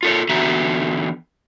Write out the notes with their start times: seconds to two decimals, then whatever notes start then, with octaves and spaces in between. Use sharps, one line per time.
0.03 F4 A4 C#5
0.29 D3 E3 B3 F#4 E5 A#5